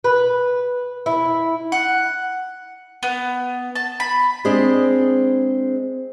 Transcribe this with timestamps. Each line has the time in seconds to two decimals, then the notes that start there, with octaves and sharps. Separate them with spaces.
0.04 B4
1.06 E4
1.72 F#5
3.03 B3
3.75 A5
4.00 B5
4.44 G#3 C4 D4 G#4 D#5